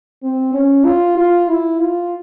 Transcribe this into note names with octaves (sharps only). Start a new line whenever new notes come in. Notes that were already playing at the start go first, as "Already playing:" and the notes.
C4
C#4
F4
F4
E4
F4